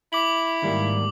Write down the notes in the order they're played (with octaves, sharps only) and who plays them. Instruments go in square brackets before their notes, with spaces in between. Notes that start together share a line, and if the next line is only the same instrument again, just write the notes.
[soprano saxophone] E4 [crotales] D6 F#7
[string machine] G#2 [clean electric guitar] D#3 G3 A#3